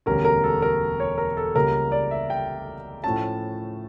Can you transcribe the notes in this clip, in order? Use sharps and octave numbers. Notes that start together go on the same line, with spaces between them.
E1 D2 D3 G3 C#4 A#4
A#4
A4
A#4
C#5
A#4
A4
C#2 C#3 G3 A#3 A#4
D5
E5
G5
A2 F3 A3 C#4 A5